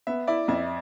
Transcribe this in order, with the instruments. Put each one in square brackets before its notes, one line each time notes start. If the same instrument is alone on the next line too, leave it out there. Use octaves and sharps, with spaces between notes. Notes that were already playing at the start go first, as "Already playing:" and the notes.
[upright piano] B3 [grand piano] E5
[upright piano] E4 [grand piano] D5
[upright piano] F2 [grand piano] E5